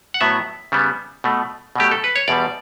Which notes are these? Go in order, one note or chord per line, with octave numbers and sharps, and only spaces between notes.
F#5
A2 F#3 B3 E5
C#3 G3 B3
B2 A3
B2 F#3 A3 G4
A4
B4
C#5
E2 B2 G3 D5